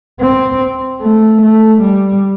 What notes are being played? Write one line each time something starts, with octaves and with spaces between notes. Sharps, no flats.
C4
A3
A3
G3